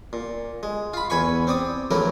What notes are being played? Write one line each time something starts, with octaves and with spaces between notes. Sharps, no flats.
A#2
G#3
F4 B5
E2 B4 G#5 B5 C#6
C4 D5 D#6
A#1 E3 F#3 A3 E4 A#4